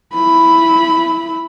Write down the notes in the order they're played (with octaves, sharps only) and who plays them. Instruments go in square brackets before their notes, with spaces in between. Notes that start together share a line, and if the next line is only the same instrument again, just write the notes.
[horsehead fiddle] E4 B5